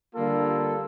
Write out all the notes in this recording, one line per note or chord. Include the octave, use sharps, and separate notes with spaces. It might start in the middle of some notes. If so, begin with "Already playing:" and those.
D3 G3 A#3 F4 A4